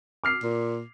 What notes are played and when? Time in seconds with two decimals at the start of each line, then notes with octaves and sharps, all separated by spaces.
0.24 D6 F6 C7
0.43 A#2